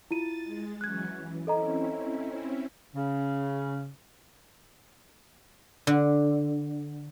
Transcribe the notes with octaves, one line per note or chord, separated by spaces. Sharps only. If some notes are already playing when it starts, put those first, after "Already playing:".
E4 F4 A6 D#7
G#3
E3 F#3 C#4 F#6 G#6
E3
C4 C#4 E4 A4 D#5 A#5
C#3
D3